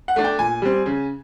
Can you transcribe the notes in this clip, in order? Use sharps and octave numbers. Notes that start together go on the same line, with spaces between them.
F#5
A3 D4
G5
A#2 G#5
G3 C4
C#3